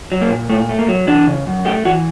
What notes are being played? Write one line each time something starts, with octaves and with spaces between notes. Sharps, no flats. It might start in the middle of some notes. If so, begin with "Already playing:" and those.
F#3
A#3
A#2
A#2 A3
A3
A#3
F#3
E3 D4
C#3
F#2
A3 G4
E3 F#4